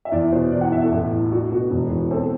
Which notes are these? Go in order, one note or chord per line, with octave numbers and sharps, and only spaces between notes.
E5
E2 D5
B2 C5
E3 D5
F#5
E2 E5
A4
A1
A2
E4
D4 F#4
B2 F#4
E1
E2
C4 A4